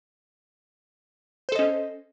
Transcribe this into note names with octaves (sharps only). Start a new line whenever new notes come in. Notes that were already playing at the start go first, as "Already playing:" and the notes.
C#4 A4 C5 D#5